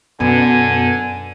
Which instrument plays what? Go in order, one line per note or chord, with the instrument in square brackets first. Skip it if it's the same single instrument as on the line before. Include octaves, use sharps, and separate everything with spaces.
[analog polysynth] F#2 B2 B3 [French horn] D3 [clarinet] G#5